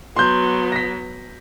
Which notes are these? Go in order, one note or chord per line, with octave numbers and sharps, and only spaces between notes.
F#3 B3 C6 G6
A#6 B6